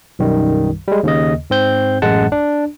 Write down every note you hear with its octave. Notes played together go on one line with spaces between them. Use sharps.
B1 F#2 D#3 G3
G3 G#3
D#2 C#3 D#5
G#2 C4 G6
A1 F#2 G#3 F#5 A5
D4